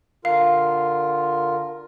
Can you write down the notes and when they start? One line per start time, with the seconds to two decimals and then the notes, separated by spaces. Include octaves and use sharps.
0.25 D3 F4 A#4 F5